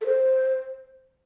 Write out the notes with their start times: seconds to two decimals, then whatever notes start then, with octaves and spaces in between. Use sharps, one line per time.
0.01 A4
0.06 C5